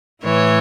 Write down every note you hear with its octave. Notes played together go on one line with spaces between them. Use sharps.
A2 E3 C#5